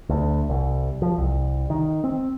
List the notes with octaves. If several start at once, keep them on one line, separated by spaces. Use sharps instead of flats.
D2
C2
F3
C2
D#3
C4